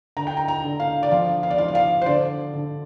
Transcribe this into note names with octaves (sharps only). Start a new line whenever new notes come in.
D3 A#5
G5
A#5
A#5
D3
F5
D5
F3 F5
F5
D5
F3 F5
D5
F5
C5
D3 D5
D3